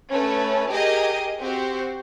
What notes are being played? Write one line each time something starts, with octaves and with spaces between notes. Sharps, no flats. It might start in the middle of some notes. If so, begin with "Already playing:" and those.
A3 C#4 B4
G4 G#4 A#4 D#5
C4 F#4 G4 C5